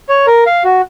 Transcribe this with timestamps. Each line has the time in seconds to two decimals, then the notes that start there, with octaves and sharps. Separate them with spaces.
0.09 C#5
0.27 A#4
0.46 F5
0.64 F#4